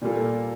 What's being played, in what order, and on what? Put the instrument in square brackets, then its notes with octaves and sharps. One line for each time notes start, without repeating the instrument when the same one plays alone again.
[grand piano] A#2 G3 A#3 F4 A4